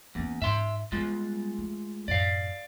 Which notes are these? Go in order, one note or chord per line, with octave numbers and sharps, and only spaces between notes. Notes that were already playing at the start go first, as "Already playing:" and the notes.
E2 A#3 C#4
G#2 E5 C6
G3 G#3 B3 F4
A3
F#2 A2 D5 F5